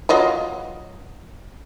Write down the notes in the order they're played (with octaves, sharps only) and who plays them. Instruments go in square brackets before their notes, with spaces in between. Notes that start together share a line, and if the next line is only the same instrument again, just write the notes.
[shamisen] F#3 F4 D#5